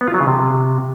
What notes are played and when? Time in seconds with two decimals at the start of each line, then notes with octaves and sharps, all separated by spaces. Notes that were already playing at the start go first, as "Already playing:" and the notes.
0.01 B3
0.08 F4
0.14 F#3
0.21 C#3
0.27 C3